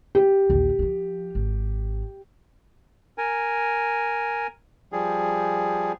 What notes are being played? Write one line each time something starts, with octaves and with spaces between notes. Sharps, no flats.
G4
A#1 D#2
F3 F#3
G#1
A#4 G#5
F3 G3 G#4